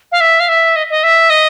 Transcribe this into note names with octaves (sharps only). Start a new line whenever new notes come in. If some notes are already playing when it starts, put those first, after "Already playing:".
F5
E5
F5
E5
D#5
D#5
E5
D#5